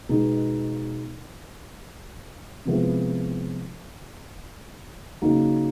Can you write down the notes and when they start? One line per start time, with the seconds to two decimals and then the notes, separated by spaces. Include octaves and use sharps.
0.09 B2 G#3 B3 D#4
2.65 C3 F3 G#3 B3 E4
5.22 C#3 F#3 A#3 D#4